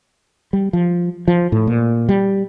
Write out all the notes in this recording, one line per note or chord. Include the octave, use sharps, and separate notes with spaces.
G3
F3
F3
A2
A#2
G3